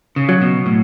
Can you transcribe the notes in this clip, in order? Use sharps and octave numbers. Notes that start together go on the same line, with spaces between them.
C#3
F#3
B2
A2